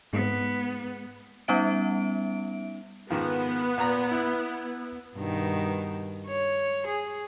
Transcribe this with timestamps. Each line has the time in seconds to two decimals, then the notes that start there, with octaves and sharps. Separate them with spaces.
0.13 G#2 B3
1.48 G3 B3 C#4 D#4 E5 D7
3.11 G#2 D#3 F3 B3
3.78 A#2 A#5
4.11 E4
5.17 G2 B2 D#3
6.27 C#5
6.87 G#4